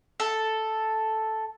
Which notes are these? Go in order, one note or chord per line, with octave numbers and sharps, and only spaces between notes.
A4